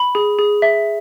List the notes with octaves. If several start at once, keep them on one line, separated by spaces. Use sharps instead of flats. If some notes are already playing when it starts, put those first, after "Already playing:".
Already playing: B5
G#4
G#4
E5